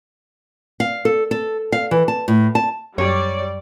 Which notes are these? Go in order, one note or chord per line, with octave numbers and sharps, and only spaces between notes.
F5
A4
A4
F5
E3
A5
A2
A5
F#2 G3 C#5 D5